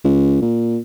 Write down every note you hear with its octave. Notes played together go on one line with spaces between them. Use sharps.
C#2
A#2